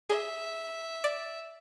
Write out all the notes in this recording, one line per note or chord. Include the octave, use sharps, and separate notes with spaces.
G#4 E5
D5